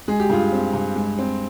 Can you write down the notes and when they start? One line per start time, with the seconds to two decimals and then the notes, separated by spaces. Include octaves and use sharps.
0.08 G#3 G#4
0.20 G4
0.30 G2 F4 G#4
0.53 C4
0.73 G2
0.96 G#3
1.19 C4